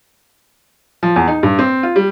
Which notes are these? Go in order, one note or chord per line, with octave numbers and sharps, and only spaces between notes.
F3
E2
D#4
G2
C4
F4
G3